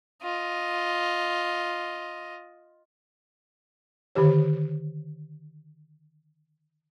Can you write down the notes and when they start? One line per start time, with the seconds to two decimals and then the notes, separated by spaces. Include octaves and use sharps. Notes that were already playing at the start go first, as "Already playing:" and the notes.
0.23 F4 D#5
4.15 D3 D#3 G4 C#5